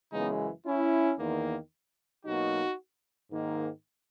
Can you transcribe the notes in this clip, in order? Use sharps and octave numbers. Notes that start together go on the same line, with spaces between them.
F#2 C#3 E3 G#3 B3 D#4
C#4 E4
E2 D#3 A#3
B2 F#3 A#3 D#4 F#4
G#2 D#3 A#3